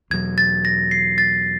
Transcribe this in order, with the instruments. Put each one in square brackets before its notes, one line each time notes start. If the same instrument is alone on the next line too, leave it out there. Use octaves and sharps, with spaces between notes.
[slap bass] E2 B2 F#3 [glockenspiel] G#6
[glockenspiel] A6
A#6
C7
A6